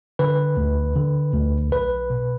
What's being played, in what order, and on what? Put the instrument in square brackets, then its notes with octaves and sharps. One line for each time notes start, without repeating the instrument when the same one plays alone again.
[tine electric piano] D3 B4
D2
D3
D2
B1 B4
B2